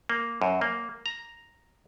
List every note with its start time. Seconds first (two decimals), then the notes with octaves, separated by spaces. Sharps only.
0.09 A#3
0.42 F#2
0.61 A#3
1.06 A#5